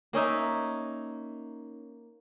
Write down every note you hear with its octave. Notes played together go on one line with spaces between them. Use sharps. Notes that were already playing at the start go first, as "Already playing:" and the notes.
A#3 C#4 D#4 E5